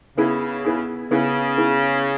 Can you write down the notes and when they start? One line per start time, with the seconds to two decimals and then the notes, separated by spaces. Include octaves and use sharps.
0.18 C#3 B3 E4 G#4
0.65 B3 E4 G#4
1.11 C#3 B3 E4 G#4
1.57 B3 E4 G#4